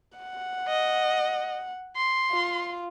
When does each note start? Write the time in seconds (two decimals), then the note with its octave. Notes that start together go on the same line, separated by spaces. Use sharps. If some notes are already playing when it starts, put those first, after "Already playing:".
0.18 F#5
0.68 D#5
1.96 C6
2.31 F4